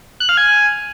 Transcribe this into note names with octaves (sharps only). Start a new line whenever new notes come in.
F#6
F5
G#5